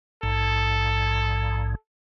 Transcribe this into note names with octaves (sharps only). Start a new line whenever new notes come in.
A#1 G#2 A4